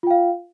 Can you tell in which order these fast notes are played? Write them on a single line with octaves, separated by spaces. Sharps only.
F4 G5 F5